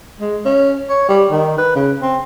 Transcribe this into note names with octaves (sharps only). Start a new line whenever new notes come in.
G#3
C#4
C#5
G3
D#3
B4
C#3
C4